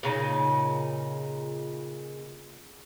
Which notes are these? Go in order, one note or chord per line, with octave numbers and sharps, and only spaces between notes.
A#2 C#3 D#4